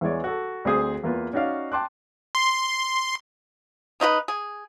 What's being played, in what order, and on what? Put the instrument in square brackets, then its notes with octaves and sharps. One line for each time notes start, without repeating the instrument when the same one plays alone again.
[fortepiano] E2 E3 G#3 C#5 D5
F#4 A4
D2 C4 G#4 C5 D#6
E2 A#3 F4 B4
C#4 D#4 F#4 D5 F5
G5 A5 C6 D6 F#6
[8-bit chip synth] C6
[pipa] C#3 D#4 F4 B4
G#4